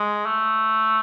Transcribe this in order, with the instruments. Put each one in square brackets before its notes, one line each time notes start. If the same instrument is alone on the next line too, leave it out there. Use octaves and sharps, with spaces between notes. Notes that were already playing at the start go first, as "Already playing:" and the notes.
Already playing: [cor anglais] G#3
A3